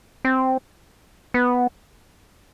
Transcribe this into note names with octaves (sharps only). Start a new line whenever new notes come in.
C4
B3